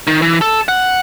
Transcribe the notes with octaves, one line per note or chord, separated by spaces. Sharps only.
D#3
E3
A4
F#5